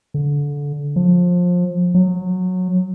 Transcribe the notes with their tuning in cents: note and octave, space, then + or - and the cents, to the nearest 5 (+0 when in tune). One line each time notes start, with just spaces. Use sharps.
D3 -25
F3 +25
F#3 -15